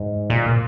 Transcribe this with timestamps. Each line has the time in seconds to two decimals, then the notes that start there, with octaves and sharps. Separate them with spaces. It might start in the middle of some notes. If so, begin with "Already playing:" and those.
Already playing: G#2
0.30 A#2